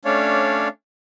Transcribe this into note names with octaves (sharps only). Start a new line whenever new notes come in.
A3 C#4 D4 C#5 D5 F5